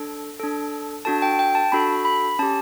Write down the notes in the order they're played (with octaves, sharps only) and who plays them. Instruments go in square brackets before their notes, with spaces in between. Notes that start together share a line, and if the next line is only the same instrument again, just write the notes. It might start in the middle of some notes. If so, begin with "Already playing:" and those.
Already playing: [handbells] D4 A4
D4 A4
D4 F#4 A4 A5
G5
G5
A5
D4 F#4 A4 B5
B5
C#4 G4 A5